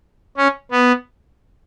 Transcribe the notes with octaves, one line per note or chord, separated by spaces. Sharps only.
C#4
B3